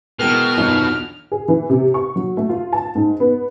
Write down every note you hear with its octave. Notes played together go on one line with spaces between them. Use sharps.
B2 E3 G#3 A#4 G5 A#5 F6
B1 E2 D4 D#4 F4
G#4
E3
C3
C#6
F#3
A3
F4
A5
G#2
B3